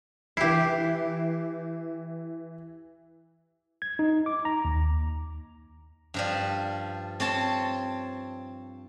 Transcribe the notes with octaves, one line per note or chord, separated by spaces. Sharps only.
E3 E4 G4 C7
G#6
D#4
D6
A#5
D#2
G2 F3 G3
C4 C#5 A5 C6